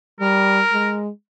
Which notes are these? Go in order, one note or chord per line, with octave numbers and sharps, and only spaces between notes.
G3 A#4
G#3